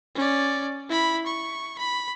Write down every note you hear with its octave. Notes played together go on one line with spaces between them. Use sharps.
C#4 D5
E4 B5
C#6
B5